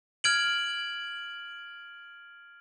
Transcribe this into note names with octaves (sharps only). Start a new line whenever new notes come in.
F6 G#6 D7 F#7